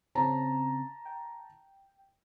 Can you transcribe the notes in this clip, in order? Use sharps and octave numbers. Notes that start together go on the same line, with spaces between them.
C#3 C4 C#4 A5 A#5
G5